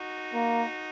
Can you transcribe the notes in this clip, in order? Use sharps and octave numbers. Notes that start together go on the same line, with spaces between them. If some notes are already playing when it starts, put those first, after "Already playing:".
Already playing: D#4 F#4
A#3